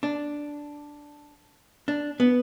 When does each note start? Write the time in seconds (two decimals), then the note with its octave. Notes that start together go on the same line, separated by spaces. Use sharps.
0.03 D4
1.88 D4
2.20 B3